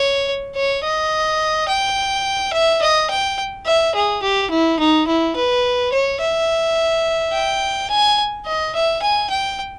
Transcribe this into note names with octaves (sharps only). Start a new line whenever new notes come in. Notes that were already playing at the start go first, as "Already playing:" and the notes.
Already playing: C#5
C#5
D#5
G5
E5
D#5
G5
E5
G#4
G4
E4
D#4
E4
B4
C#5
E5
G5
G#5
D#5
E5
G#5
G5